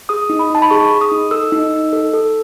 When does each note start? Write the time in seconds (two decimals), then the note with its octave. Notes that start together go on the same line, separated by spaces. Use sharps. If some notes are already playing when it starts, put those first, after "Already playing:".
0.09 G#4 D#6
0.30 D#4
0.39 B5
0.50 D#4 A5
0.62 B5
0.70 G#4 C#6
0.91 G#4
1.01 D#6
1.12 D#4
1.31 A4 E6
1.52 D#4
1.73 D#4
1.93 A4
2.13 A4